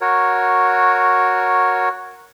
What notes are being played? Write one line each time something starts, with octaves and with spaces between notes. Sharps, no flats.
F#4 A#4 C#5